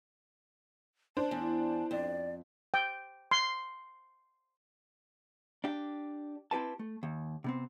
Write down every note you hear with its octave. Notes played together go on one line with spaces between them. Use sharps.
D4 C5 A5
E2
F2 D5
G5
C6
D4 G4
C4 E4 G4 B4 A5
A3
D#2
C3 B3 C4